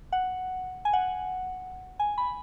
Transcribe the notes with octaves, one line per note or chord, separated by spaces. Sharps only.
F#5
G#5
F#5
G#5
B5